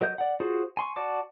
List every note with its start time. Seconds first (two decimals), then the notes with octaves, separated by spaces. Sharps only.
0.01 F#3 A#4 D#5 G6
0.18 D5 F#5
0.40 F4 F#4 G#4 C5
0.77 G#5 C6 C#6
0.96 F#4 D5 A5 D6